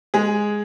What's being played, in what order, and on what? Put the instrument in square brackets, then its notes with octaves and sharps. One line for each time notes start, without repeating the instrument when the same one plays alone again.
[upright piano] G#3 G#4